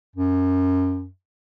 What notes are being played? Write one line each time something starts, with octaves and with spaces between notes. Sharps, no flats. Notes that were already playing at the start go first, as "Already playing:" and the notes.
F#2